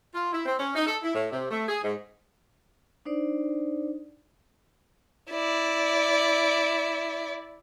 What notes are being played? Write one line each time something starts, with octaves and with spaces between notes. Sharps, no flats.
F4
E4
C4
C#4
D#4
A4
E4
A2
C3
A3
G#4
G#2
D4 D#4 C5 D5
E4 D5